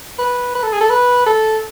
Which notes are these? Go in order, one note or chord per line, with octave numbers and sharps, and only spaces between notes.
B4
B4
A4
G#4
A4
B4
A4